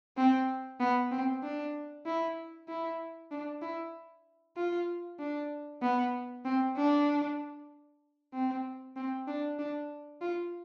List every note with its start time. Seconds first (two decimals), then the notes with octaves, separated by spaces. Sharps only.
0.17 C4
0.80 B3
1.12 C4
1.43 D4
2.06 E4
2.68 E4
3.31 D4
3.62 E4
4.57 F4
5.19 D4
5.82 B3
6.45 C4
6.77 D4
8.34 C4
8.96 C4
9.27 D4
9.59 D4
10.22 F4